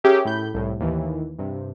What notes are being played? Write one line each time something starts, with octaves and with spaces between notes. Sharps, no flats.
C#4 G4 G#4 A#4 E5
A2 B5 G6
C2 A2
D#2 E3
G2 C3